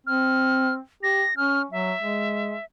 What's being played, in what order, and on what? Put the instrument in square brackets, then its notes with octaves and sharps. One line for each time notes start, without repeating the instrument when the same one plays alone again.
[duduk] C4 [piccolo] F6
[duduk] G4 [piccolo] A#6
[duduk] C#4 [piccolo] F6
[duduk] F#3 [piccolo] E5
[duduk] G#3